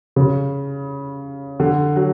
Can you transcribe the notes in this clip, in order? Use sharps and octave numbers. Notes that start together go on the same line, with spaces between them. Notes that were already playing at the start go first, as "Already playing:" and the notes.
C#3
D3
F#3